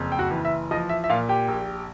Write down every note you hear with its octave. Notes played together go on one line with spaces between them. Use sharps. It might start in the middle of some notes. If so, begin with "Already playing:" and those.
Already playing: F#1 F2
G5
F#4 F#5
E3
E5
F3 D#5
E5
E5
A#2 F4 F5
G4 G5
A#1